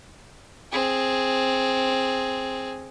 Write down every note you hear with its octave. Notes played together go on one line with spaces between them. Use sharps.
C4 G#4